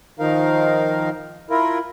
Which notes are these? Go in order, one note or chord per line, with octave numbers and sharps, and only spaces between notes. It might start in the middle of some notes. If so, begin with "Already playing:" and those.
D#3 F3 D#4 A#4 F5
E4 F4 A#4